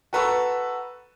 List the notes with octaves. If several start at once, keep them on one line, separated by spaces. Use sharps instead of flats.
F#4 A4 B4 A#5 C#6 E6